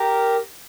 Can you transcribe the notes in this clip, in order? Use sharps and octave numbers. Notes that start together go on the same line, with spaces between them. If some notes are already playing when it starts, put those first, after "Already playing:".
Already playing: G4 A#4